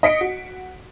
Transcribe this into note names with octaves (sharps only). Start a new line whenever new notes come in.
D#5 B6 C#7 D7
F#4